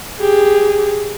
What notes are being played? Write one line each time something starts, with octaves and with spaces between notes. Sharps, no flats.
G4 G#4